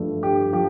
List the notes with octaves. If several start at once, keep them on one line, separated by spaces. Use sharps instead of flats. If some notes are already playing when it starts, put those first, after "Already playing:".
Already playing: G2 F3 A3
G2 G4
F3 G4